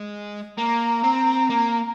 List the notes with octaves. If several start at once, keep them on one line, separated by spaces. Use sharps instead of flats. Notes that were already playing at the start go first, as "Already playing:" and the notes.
Already playing: G#3
A#3 A#5
C4
A#3